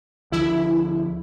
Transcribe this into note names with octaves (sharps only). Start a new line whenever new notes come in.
D2 F3 E4